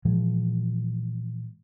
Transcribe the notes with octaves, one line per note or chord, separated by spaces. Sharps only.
A#2 E3 F3 G#3